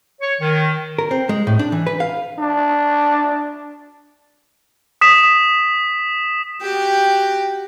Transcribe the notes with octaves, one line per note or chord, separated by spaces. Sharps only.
C#5
D#3
A#4
C4
G#3
A2
D4
E3
B4
F5
D4
D#6 B6 E7
F#4 G4 G5